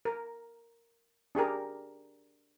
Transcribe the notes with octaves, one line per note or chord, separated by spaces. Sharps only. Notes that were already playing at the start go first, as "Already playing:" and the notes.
A#4
D4 G4 G#4 A#4